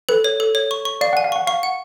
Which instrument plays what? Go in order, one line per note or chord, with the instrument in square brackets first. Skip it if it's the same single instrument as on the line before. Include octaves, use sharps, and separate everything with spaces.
[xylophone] A4 [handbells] B4
[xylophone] C#5
A4
C#5
C#6
C#6
[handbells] D5 [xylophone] F5
[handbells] F#5 [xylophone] G#5
[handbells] F5
[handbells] F#5 [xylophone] C#6
[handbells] F5 [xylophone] C#6
[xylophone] F#5